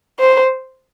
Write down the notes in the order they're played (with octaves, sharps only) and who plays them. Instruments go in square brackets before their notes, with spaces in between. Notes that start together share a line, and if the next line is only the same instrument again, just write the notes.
[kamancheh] C5